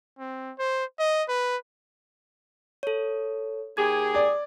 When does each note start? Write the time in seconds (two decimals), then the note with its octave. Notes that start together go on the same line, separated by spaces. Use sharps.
0.19 C4
0.59 C5
0.99 D#5
1.28 B4
2.83 A4 C#5
3.77 D#2 G4 G#4 G#6
4.15 D5